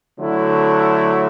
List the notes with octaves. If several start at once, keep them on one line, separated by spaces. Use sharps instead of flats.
D3 F#3 A3 E4